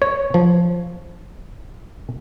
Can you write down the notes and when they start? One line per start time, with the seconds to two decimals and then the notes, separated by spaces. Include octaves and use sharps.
0.02 C#5
0.34 F3